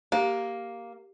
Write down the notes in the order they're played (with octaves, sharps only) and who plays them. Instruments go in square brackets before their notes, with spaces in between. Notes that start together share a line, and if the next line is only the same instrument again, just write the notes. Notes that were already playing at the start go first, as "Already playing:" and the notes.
[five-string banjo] A#3 [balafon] G4